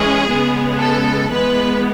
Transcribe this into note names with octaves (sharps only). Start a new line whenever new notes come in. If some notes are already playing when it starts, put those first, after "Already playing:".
Already playing: E3 G#3 C#4 G#4
C#3 G#3 B3
A4
E3 G#3 B3 B4